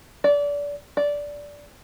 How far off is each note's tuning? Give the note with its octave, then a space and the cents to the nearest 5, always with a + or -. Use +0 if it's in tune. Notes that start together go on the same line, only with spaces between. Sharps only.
D5 -25
D5 -10